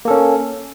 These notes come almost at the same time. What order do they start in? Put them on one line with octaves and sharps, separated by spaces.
A#3 A4 C#4